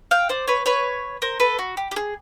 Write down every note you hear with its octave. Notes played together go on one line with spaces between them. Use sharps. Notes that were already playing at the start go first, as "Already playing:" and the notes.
F5 G5
C5 D5
B4 C#5
B4 C#5
A#4 C5
A4 B4
F#4
G4
G4
G#4